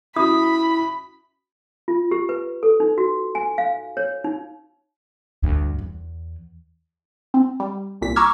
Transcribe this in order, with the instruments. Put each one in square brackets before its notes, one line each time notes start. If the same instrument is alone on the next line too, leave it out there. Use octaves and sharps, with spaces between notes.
[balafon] C#4 F#4 [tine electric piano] E4 [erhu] B5 [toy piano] D#6
[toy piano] F4
G4
B4
A4
D#4
F#4
G#5
F5
C#5
D#4
[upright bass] D2 G2
E2
[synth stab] C4
G3
C2 A#2 B6
A#5 C#6 D6 E6 F6 G#6